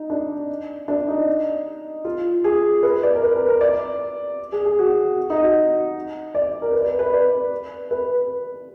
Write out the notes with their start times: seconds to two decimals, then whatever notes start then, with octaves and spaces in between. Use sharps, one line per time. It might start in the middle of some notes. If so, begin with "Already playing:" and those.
Already playing: D#4
0.10 D4
0.88 D4
1.08 D#4
2.05 F4
2.44 G#4
2.83 B4
3.03 D5
3.15 A#4
3.23 B4
3.36 A#4
3.48 A#4
3.61 D5
4.52 G#4
4.65 G#4
4.79 F#4
5.30 D#4
5.43 F#4
6.35 D5
6.62 A#4
6.73 B4
6.81 D5
6.86 B4
6.99 B4
7.13 D5
7.91 B4